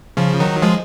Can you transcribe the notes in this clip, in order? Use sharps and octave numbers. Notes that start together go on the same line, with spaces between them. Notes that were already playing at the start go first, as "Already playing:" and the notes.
C#3 F3
D#3 F#3
F3 G#3